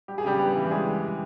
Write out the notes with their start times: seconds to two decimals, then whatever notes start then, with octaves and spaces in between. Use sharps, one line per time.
0.08 G3 G4
0.18 G#4
0.24 C#3 G3 G4
0.39 B3
0.56 E3
0.71 G3 G#3 G#4